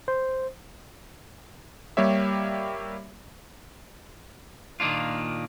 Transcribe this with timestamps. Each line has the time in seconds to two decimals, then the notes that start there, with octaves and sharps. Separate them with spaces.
0.08 C5
1.97 G3 A#3 G4 C#5 E5
4.80 A#2 D#3 A#3 D4 F4